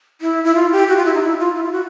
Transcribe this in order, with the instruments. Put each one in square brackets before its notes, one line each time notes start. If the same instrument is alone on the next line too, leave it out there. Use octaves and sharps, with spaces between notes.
[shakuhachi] E4
E4
F4
G4
F#4
F4
E4
D#4
E4
F4
E4
F4
F#4